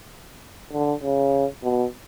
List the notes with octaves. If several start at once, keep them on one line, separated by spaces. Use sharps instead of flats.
D3
C#3
B2